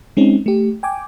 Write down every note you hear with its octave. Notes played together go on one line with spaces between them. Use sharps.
G#3 C4 C#4 D#4
A3 G4
G5 G#5 D6